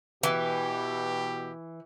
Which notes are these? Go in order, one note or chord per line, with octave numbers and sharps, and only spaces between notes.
B2 E3 G4